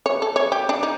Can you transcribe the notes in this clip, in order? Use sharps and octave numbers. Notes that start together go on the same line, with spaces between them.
C#5
A4
C#5
G4
D4
D#4